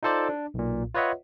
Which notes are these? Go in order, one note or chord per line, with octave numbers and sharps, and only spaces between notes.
D#4 F4 A4 C5 D5
D4
B1 A#2
F4 B4 C#5 D#5 E5 F#5